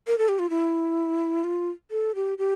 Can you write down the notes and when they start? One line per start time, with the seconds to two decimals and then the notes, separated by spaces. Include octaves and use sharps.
0.07 A#4
0.18 A4
0.29 G4
0.39 F4
0.50 E4
1.44 F4
1.91 A4
2.15 G4
2.38 G4